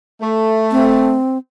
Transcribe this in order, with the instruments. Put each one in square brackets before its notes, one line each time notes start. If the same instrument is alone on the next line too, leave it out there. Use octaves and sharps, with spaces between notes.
[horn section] A3
[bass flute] C4